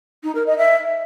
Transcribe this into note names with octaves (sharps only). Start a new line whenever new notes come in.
D#4
A#4
D#5
E5